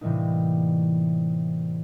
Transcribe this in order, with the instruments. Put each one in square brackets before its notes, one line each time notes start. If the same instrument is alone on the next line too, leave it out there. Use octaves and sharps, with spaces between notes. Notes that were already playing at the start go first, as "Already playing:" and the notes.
[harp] A2 C3 E3 G3 A#3 D#4